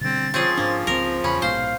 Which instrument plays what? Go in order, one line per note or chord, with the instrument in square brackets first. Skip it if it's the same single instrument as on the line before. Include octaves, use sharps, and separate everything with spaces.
[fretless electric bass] B2 D3 G3 [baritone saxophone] C4 [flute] A6
[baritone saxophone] F3 [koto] C4 C#4 G#4
[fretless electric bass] G#2 D4 [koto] A#3
[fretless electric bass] C#2 F#3 C4 [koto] A#4
[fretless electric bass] E2 C#3 [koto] C#4 [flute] B5
[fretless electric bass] A#1 G#2 B2 [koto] C5 [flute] F5